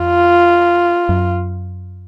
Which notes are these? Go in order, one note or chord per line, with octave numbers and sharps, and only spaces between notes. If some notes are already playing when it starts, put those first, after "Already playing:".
Already playing: F2 F4
F#2